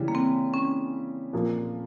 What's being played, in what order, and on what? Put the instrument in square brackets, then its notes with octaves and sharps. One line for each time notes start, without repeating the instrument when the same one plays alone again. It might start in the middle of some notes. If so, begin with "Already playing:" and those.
Already playing: [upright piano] C#3 E3 G3
[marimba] A#3
C4
C#4
[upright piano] A#2 F3 A#3